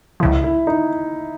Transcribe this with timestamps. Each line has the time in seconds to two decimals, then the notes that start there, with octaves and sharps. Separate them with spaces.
0.20 C#2 C#3 F3 E4
0.44 E4
0.67 D#4